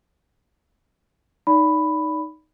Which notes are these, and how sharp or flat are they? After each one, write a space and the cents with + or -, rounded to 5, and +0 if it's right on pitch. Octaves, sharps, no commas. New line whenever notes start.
D#4 +0 D5 -30 B5 +5